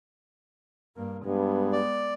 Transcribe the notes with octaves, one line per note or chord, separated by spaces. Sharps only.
G2 A#3
G2 G#3 B3
D5